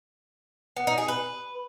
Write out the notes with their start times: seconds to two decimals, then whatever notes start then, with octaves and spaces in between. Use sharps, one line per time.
0.76 B3
0.87 D#4
0.98 G#4
1.08 B4